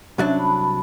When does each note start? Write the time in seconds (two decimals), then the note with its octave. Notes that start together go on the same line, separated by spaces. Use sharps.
0.18 C2 F#3 C#4 D4 E5
0.39 A5 B5